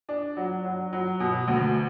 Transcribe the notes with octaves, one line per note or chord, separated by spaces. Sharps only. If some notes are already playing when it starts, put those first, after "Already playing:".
D4
F#3
F#3
F#3
B2
D2